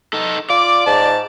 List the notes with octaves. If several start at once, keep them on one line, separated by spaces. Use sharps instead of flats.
D#4 A4
F4 D5 D6
G#2 A5